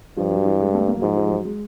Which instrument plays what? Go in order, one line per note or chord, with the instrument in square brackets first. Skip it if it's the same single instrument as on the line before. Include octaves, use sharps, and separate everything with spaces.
[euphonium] G2 [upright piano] F3
[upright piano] F#3
E3
G#3
A3
A#3
F#3
[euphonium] G#2 [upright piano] F3
[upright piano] F3
G3
F#3
G#3